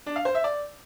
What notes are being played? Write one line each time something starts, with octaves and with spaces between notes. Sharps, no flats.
D4
F5
C5
E5
D5